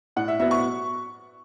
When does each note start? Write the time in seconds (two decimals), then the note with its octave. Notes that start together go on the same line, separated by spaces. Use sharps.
0.16 A2 F#5
0.28 E5
0.39 F#3 B3 E5
0.51 C#6